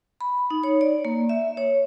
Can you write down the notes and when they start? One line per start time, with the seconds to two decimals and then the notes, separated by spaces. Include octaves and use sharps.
0.21 B5
0.50 D#4
0.64 C#5
0.81 D5
1.05 A#3
1.29 E5
1.57 C#5